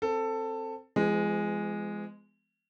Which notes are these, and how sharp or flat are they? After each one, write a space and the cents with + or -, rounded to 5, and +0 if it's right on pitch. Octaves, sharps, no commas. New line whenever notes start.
C4 +5 A4 +15
F3 -45 G#3 -5 B3 +35